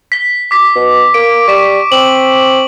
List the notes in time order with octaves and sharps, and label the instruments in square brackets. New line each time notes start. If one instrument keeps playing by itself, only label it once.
[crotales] B6 G7
D6 B6
[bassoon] B2
[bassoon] A#3 [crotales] D7
[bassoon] G3 [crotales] C#6 B6 E7
[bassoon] C4 [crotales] E7 F#7